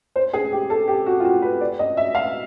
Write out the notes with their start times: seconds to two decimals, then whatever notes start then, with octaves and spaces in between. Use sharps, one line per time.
0.16 C5
0.33 G#4
0.52 G4
0.70 A4
0.88 G4
1.06 F#4
1.20 F4
1.25 F#4
1.42 B4
1.61 D5
1.79 D#5
1.97 E5
2.15 F5